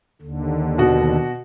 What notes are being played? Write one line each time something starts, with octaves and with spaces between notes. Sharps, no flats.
D#2 D3
B2 F#4